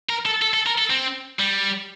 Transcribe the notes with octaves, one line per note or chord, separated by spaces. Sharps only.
A#4
A4
A4
A4
A#4
A4
C4
G3